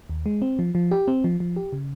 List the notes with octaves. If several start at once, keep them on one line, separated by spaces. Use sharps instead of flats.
D#2
G#3
C4
F3
F3
G4
C4
F3
F3
G4
C#3